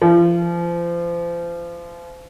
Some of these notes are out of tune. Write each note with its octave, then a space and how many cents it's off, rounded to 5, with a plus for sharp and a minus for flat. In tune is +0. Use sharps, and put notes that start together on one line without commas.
F3 -30